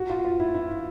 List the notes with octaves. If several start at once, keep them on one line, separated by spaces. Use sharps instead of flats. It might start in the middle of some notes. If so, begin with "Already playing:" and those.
Already playing: F#4
F4
F4
E4
E4